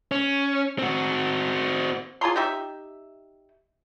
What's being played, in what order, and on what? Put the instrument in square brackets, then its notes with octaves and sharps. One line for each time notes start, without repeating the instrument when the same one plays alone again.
[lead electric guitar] C#4
C4 F#4
[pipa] F4 G#4 A#5 C6
D#4 G4 E5